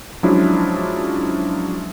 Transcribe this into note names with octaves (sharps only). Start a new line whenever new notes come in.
F3 F#3 G#3 C#4 D4 E4